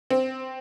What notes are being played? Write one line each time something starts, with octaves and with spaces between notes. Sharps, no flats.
C4